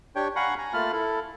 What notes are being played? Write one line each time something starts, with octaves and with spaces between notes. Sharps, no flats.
D4 G4 C#5 G5
F5 F#5 G#5 A#5 B5 C#6
G#5 A#5
A3 A#3 F4 A5 B5 F6
E4 A4